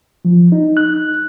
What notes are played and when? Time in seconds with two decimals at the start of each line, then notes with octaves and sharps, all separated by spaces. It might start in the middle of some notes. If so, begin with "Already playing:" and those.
0.25 F3
0.52 D#4
0.77 F#6